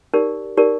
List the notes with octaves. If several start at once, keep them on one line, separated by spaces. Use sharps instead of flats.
D#4 G4 A#4 D5
D#4 G4 A#4 D5